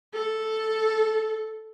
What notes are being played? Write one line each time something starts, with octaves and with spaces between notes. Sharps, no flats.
A4